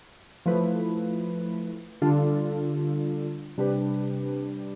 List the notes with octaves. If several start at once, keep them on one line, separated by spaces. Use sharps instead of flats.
F3 A3 E4 B4
D3 G3 D4 F4 A4
C3 G3 D4 G4 B4